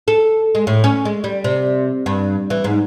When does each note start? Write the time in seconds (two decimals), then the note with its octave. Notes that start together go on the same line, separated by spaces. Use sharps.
0.08 A4
0.55 G#3
0.67 A2
0.84 C#4
1.05 G#3
1.24 G3
1.44 C3
2.06 G2
2.50 E3
2.64 G#2